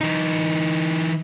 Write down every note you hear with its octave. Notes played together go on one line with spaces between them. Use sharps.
E3 D#4